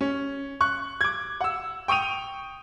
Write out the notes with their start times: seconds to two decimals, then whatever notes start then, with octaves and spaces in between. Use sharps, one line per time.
0.01 C#4
0.61 C#6 F#6
1.01 D6 G#6
1.41 F#5 E6
1.88 G5 C#6 D#6 D#7 F7